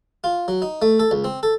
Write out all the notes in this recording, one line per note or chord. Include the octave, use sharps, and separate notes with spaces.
F4
F#3
D#4
A3
A4
C#2
C4
A4